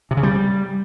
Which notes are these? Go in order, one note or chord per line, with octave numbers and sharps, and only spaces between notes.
C3
C#3
G3